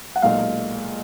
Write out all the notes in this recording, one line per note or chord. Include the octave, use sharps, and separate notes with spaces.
F#5
B1 A#2 G#3 F5